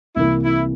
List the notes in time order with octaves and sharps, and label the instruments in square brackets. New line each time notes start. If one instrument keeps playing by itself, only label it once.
[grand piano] C2 C3 E3 A#3 [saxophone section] E4
[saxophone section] E4